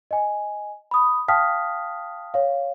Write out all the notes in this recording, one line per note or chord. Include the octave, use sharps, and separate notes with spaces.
D#5 G#5
B5 D#6
F5 G5 A5 D#6 F6 B6
C#5 F5